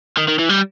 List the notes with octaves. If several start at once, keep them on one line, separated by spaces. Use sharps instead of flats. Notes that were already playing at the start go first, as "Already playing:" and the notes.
D#3
D#3
E3
G3